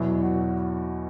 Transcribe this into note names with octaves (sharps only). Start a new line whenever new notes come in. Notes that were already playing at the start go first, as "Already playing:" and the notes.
Already playing: E2 B2 F#3 E4
F#4